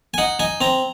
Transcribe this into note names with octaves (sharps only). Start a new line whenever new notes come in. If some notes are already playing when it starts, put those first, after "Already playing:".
G#5
D#4 F#5
D#4 G#5
C4 A#5